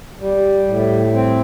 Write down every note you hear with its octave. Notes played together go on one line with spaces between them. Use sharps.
G3
A2
C4